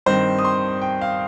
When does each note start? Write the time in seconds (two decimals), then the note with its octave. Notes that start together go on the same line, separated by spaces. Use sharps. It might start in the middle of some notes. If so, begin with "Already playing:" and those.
0.06 G2 D#3 C4 C5
0.39 D#6
0.45 C6
0.82 G5
1.01 F5